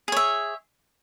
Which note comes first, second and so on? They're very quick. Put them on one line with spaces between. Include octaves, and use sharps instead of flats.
G#4 C#5 E5